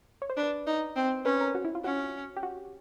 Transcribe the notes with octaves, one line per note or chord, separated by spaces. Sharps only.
C#5
C5
D4 B4
D#4
C4
C#4 B4
A#4
F#4
E4
F4
C#4 F#4
G4
F#4